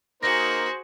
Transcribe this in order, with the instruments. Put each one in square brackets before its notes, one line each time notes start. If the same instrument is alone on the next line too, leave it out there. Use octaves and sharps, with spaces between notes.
[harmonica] A#3 D#4 [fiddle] F#4 G#4 [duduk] C5 [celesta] A#6